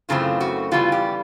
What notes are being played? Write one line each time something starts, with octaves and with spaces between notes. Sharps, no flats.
F#2 C#3 E3 A3 C4 F4
F#4
C#3 E3 G3 B3 F4
G4